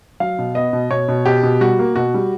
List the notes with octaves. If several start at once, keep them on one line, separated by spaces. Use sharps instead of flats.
F#3 F5
B2
B3 D#5
B2
B2 C#5
B2
B2 G4
B2
G3 F#4
A#3
B2 F#4
G3